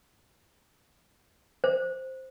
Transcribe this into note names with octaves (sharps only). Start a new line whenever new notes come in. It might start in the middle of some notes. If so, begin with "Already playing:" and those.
C5